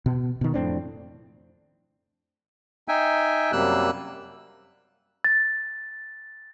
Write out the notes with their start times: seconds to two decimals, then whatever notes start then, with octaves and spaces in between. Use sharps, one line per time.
0.06 B2
0.41 B2 D#3
0.54 F2 A2 C4 D4
2.88 D#4 E5 G5 G#5
3.52 F#2 C3 G3 A#3 E6 F#6
5.24 A6